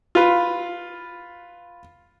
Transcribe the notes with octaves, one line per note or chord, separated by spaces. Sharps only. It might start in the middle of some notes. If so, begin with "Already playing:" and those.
F4 B4